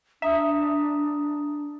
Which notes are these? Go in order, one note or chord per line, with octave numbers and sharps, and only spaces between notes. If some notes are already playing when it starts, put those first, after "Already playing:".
D4 E5 A#5 D#6 E6